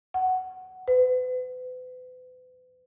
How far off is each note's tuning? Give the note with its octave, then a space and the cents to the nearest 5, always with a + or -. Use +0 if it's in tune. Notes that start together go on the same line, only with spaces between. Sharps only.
F#5 +10
B4 +40